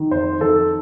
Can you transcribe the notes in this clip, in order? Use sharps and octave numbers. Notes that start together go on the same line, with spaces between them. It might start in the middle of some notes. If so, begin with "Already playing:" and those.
Already playing: D#3
F2 C5
D#3 A4